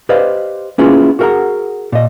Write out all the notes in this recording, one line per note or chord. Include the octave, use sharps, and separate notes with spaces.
G4 B4 C5 D5 D#5 F5
A#3 B3 C#4 E4 F4 G#4
F#4 G#4 A#4 E5 F#5 A#5
A#2 D#5